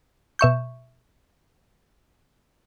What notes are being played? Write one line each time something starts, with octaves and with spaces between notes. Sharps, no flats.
B2 E5 C#6 G6